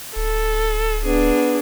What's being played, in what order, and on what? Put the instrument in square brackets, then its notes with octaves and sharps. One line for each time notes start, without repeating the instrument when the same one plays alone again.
[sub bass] D1 [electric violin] A4
[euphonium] B3 [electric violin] D4 G#4